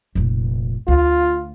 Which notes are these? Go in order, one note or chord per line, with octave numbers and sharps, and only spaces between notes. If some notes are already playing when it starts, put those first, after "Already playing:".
F1 A#2
D2 F4